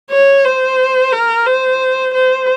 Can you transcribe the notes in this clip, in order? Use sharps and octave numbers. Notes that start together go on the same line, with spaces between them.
C#5
C5
A#4
C5
C5